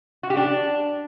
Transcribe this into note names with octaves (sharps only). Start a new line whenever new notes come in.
F#4
G4
D4